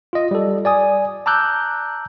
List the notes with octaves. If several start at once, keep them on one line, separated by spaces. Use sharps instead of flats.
F4 D#5
G3 A4
D5 G#5 D#6
A5 A#5 D6 E6 F#6 G6